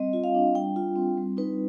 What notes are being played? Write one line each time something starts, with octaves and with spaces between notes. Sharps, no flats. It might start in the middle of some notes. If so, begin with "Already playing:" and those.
Already playing: G3 C4 D#5
F4
F5
D4
G3 G5
F4
C4
G3
D#4 B4